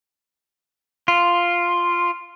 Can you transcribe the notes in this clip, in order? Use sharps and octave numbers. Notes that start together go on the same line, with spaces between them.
F4